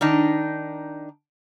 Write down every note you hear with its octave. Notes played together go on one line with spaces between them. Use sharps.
D#3 D4 D#4